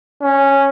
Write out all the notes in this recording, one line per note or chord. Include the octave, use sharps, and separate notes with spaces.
C#4